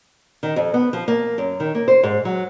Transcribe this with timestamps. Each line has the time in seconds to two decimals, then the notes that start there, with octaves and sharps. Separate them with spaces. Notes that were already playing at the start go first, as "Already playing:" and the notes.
0.43 D#3
0.56 F2
0.74 B3
0.93 F3
1.08 A#3
1.38 F#2
1.60 D#3
1.75 A#3
1.88 C5
2.03 G#2
2.25 F#3